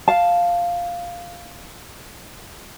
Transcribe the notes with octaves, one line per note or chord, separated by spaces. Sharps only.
F5 A5